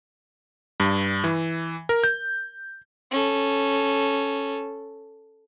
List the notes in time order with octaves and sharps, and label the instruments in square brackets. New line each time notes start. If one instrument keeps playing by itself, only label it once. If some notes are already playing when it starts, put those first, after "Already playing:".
[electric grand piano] G2
E3
A#4
G6
[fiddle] C#4 A4